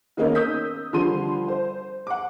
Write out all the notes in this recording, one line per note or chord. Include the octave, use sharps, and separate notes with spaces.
D#3 A#3 B3 C#4 D#4 A#4
D#6 E6 G6 B6
D3 F3 G3 C6 D#7
C5
F#5 D6